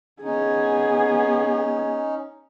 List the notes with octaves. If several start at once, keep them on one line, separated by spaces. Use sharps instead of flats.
B3 C#4 D#4 G#4